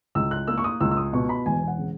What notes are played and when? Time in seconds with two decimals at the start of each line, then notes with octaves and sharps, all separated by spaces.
0.15 C#2 E6
0.31 F#6
0.47 A#3 E6
0.58 C#6
0.64 D#6
0.81 C#2 E6
0.91 E6
0.97 D#6
1.13 B2 C#6
1.29 B5
1.46 E1 G#5
1.62 G#5
1.68 F#5
1.78 C#3